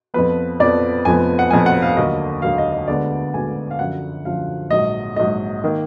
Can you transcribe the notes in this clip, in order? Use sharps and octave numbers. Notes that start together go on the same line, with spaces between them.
F2 F3 B3 B4
F2 F3 B3 D5
F1 F2 F3 B3 G#5
F#5
F1 F2 F3 B3 G#5
F#5
F5
D#2 D3 F#3 A#3 D#5
D#2 D3 F#3 A#3 F5
D#5
D#5
D2 D3 G#3 B3 D5
D2 D3 G#3 B3 G#5
F5
F#2 D3 F3 F#5
F#2 D3 F3 F5
A#1 G#2 F#3 D#5
A#1 G#2 F#3 D#5
D#3 A#3